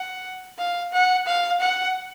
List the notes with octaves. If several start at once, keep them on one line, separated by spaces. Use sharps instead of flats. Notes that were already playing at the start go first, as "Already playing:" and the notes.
Already playing: F#5
F5
F#5
F5
F#5